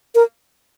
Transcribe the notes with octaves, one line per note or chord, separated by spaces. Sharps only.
A#4